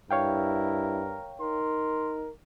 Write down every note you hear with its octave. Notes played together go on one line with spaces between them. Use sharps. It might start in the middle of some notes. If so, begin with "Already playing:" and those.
G2 E4 A#4 C#5 F5 G5
D#4 A#4 C6